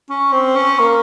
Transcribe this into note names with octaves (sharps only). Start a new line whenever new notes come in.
C#4
C4
C#4
A#3